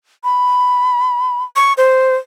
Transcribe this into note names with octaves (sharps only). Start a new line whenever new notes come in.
B5
C#6
C5